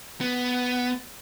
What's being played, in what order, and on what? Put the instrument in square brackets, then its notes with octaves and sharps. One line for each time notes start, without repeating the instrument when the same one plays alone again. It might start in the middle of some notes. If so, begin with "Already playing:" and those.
[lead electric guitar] B3